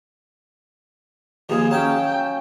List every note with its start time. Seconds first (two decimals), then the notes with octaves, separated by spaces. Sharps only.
1.49 D#2 F3 G#4 F5 G#5 D#6
1.71 F#3 C#4 G5 A5